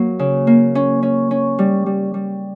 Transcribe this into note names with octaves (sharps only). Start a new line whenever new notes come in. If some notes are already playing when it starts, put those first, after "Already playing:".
Already playing: F#3 A#3
C#3
A#3
C#4
C#4
C#4
G3
G3
G3